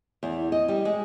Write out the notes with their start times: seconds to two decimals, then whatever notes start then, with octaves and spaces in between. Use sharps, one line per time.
0.23 E2
0.52 D#5
0.68 G3
0.85 G#3